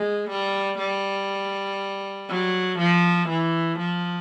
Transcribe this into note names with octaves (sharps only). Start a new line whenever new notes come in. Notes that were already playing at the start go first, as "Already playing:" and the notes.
Already playing: G#3
G3
G3
F#3
F3
E3
F3